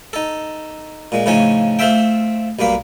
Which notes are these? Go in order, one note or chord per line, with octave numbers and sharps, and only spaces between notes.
D#4 A4
A#2 G#3
A2 C#3 F3 D#4 C#5 G#5
A3 C4 F4 C5 E5 G5
B1 G2 A#3 B4